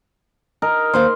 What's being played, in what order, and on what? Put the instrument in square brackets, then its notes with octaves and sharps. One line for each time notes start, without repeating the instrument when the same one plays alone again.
[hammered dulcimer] D#4 A#4
[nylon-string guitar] D#2 C5 F5 [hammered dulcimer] C6